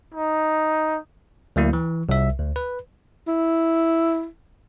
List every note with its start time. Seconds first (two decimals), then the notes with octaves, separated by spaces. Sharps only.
0.14 D#4
1.56 D2 F#3 A#3 E4
1.73 E3
2.09 C2 E5
2.40 D2
2.56 B4
3.28 E4